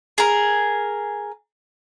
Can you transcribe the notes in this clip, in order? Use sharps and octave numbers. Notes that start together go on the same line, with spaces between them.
G#4 A#4